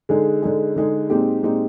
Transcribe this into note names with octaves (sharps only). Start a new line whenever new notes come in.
D3 G#3 D#4 G#4
D3 G#3 D#4 G#4
D3 G#3 D#4 G#4
A#2 G#3 C4 D#4 G4
A#2 G#3 C4 D#4 G4